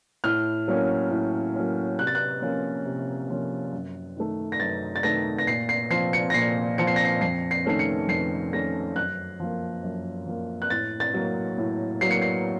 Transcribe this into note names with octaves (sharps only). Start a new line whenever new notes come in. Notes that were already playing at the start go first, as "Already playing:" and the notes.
A2 F6
F#3 A#3 C#4
A2
F#3 A#3 C#4
C3 F#6
A6
F#6
F3 A#3 C#4
C3
F3 A#3 C#4
F#2
D#3 A3
A#6
F#2 A6
A6
D#3 A3 A#6
A#6
A#2 C7
C7
F3 C4 C7
C#7
A#6
A#2 C7
F3 C4 C#7
C7
A#6
C7
F2 C7
C7
D#3 A3 C#4 C7
C#7
F2 C7
D#3 A3 C#4 A#6
F#2 F#6
F3 A#3
F#2
F3 A#3
F#6
A2 A6
A6
F#3 A#3
A2
F#3 A#3 C7
C#7
C7